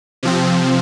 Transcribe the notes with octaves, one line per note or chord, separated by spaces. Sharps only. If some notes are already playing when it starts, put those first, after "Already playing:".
C3 F3 C4